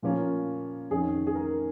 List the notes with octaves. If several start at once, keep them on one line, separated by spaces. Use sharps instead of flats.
A#2 F3 A#3 C#4 F4
F2 D#3 C#4 G#4
G#4
A#4